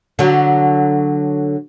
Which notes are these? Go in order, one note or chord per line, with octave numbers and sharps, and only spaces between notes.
D3 F#3